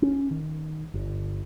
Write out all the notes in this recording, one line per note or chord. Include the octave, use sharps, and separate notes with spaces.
C#4
D#3
G1